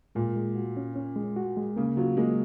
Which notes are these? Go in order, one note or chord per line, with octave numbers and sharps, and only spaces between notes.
A#2 G#3
G#3
F#4
C#4
C#4
G#3
F#4
G#3
C#3 A#3
F#3 F4
G#3 A#3